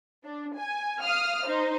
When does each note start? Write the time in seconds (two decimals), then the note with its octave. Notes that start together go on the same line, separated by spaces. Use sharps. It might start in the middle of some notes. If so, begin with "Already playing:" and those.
0.24 D4
0.57 G#5
1.03 F5 D#6 F6
1.45 D#4 C5